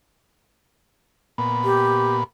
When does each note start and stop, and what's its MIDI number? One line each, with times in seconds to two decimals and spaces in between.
1.38 2.24 46
1.38 2.24 59
1.64 2.17 67